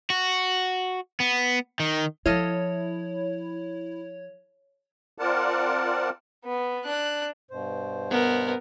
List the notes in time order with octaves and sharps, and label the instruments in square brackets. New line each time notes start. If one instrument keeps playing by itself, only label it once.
[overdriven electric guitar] F#4
B3
D#3
[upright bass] F3 [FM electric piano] E4 [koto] A4 D#5 F5 [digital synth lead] C#5
[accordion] C4 F4 A#4 D5 F#5 A5
[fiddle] B3
D4 F#6
[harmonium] G2 B2 C5
[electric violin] B3 A#4